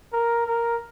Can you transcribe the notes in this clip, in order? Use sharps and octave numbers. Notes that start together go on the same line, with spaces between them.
A#4
A#4